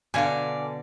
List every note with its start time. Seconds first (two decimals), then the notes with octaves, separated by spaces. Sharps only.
0.14 B2 D3 D5 F5 G#5